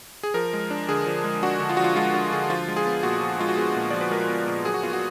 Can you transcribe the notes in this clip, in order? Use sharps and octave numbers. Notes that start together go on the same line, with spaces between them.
G#4
F3 A#4
G#3
D4
D3 G#4
F3
G#3
D4 F#4
D3
F4
F3 F#4
F4
G#3 F4
D4 F#4
D3 G#4
F3 F4
G#3
G#4
B3
A#2 F#4
F3
G#3 F4
F#4
B3 G#4
A#2
F3 D5
B4
G#3 A#4
B3
A#2
F#3 G#4
F#4
B3 F4
F#4